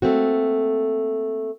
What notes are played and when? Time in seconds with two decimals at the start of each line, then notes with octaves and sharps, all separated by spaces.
0.02 A3 A#3 C4 F#4